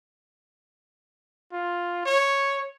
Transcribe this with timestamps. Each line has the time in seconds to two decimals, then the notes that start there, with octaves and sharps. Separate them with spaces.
1.52 F4
2.05 C#5